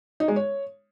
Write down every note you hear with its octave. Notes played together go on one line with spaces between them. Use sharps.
D#4
G#3
C#5